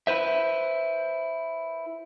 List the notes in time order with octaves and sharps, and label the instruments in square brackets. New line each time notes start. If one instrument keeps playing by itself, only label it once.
[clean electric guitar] E4 B4 C5 E5